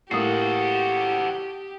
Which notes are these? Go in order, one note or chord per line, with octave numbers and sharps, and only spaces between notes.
A2 A#3 F#4 G4 A4 D#6 C7